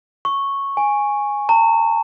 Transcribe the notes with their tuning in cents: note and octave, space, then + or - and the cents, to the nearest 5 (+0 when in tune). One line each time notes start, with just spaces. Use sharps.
C#6 -5
G#5 -5
A#5 -40